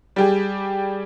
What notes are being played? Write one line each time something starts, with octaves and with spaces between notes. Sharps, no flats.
G3 G4 G#4